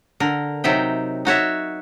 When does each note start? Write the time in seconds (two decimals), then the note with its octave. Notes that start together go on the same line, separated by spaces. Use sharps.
0.20 D3 A#4
0.64 C3 F#3 D#4 E5 G5
1.25 D#4 F#4 C#5 E5